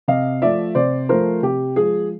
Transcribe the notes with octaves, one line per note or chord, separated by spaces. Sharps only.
C3 D#5 F5
F3 A3 D5 E5
C3 C5 D5
F3 A3 A#4 C5
C3 G4
F3 G#3 G#4